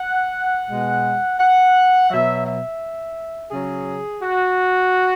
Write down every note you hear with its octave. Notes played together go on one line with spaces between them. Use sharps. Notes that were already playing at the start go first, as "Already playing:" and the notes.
Already playing: F#5
B2 G#3
F#5
B2 F#3 E5
E5
C#3 F#3 G#4
F#4